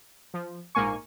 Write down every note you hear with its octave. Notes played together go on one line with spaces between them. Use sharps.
F3
A#1 G#2 A#3 G#5 C#6